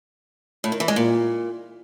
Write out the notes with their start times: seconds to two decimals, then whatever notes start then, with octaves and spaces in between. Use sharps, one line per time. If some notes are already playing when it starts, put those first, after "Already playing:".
0.64 A2
0.72 D#3
0.80 E3
0.88 G#3
0.96 A#2